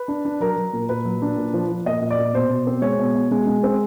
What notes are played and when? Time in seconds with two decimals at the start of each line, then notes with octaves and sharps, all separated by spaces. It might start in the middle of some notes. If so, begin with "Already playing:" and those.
Already playing: B4
0.08 D4
0.25 D4
0.40 F#3 A#4
0.56 F#3
0.73 A#2
0.89 A#2 B4
1.05 F#3
1.22 D4
1.37 A#2
1.54 F3
1.70 F3
1.86 A#2 D#5
2.01 A#2
2.11 D5
2.19 A#2
2.33 B2 C5
2.50 B2
2.67 C4
2.82 G#3 C#5
2.99 B2
3.15 B2
3.31 G#3
3.47 G#3
3.63 C4